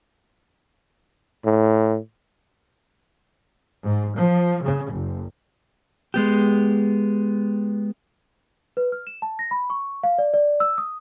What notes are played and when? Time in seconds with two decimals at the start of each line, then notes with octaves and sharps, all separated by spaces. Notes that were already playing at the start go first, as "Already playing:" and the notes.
1.45 A2
3.86 G#2
4.20 F3
4.64 C#3
4.93 F#1
6.14 G#3 B3 G4
8.77 B4
8.92 F6
9.07 E7
9.22 A5
9.39 A#6
9.51 B5
9.70 C#6
10.03 F5
10.18 D5
10.34 D5
10.60 E6
10.78 D#6